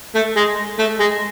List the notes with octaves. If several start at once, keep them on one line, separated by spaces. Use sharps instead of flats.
A3
G#3
A3
G#3